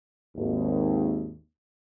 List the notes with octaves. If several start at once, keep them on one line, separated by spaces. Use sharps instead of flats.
G#1 D#2